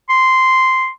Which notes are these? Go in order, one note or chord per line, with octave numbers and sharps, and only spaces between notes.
C6